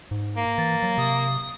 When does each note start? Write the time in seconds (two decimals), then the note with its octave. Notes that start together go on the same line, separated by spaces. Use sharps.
0.11 G#2
0.37 A#3
0.58 E3 A6
0.83 F#3
0.98 C3 D#6